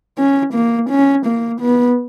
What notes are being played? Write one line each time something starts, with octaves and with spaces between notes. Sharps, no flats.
C#4
A#3
C#4
A#3
B3